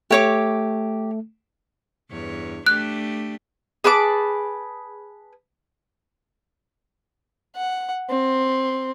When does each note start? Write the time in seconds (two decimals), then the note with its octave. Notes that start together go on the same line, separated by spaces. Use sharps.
0.11 A3 G4 C#5 D6
2.10 E2 G2 C#5
2.67 A3 D4 G4 F#6
3.84 G#4 B4 A5 D6
7.56 F#5
8.10 C4